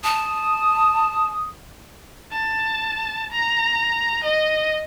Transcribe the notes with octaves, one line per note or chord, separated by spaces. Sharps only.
A5 D#6
A5
A#5
D#5